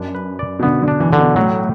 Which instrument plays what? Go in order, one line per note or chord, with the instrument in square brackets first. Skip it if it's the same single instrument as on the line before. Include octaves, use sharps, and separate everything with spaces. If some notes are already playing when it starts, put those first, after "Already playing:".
Already playing: [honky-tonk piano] F#2 [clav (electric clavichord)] D4
[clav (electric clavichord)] B4
D5
[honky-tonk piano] B2
[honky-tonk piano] D3 [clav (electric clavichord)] B3
[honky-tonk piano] D3
[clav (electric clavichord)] D4
[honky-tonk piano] E3
[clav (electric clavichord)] D3
[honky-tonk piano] B2
[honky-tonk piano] A2 [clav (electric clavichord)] F#3